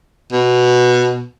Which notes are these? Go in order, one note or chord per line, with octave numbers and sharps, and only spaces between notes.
B2